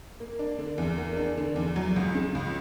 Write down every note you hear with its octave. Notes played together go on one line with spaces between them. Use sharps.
A#3
D4
D3
E2
A#3
D4
D3
E2
F#3
C#2
C#3
C#2